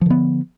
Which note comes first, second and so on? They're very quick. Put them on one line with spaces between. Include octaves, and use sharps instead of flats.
F3 D3 B3